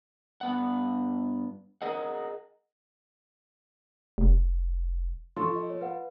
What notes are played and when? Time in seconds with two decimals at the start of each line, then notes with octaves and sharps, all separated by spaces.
0.41 G2 B3 F#5
1.82 G#4 A#4 D#5 F#5
4.18 F1
5.36 F3 A4 C6 C#6
5.56 D#5
5.70 C#5
5.81 B4 F5 F#5